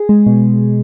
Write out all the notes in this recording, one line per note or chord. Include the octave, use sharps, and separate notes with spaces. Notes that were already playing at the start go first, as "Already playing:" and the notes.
Already playing: G#4
G#3
B2